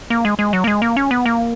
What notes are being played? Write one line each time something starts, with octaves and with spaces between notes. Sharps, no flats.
A#3
G#3
G#3
F#3
A#3
G#3
A#3
C#4
B3
A#3